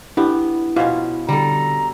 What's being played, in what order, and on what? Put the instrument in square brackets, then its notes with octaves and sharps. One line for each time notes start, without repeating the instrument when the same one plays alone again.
[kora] B3 [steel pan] D4 G4 [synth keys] E4
[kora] B2 C#4 [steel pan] F4 F5
[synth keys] D3 [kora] G3 A4 [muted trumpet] A#5